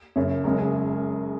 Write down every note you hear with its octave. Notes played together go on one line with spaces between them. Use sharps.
F#1 F#2 C#3 C#5
F#1 F#2 C#3 G#3 A#4
G#4